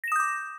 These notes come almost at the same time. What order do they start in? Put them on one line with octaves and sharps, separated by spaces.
A#6 E7 D#6 G6 D6